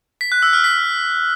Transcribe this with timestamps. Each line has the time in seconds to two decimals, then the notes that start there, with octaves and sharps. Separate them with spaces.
0.21 B6
0.32 F#6
0.42 E6
0.53 F6
0.64 B6